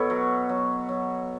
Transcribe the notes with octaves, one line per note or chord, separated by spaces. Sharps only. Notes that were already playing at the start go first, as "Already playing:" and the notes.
Already playing: B2 A4 B4 C#5
F#3
F#3
F#3